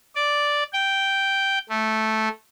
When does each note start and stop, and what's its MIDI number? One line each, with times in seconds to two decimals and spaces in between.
0.16 0.63 74
0.73 1.58 79
1.69 2.29 57